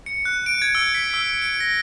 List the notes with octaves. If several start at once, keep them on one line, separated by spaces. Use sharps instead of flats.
C#7
F#6
D7
G#6
E6
B6
E6
D7
A#6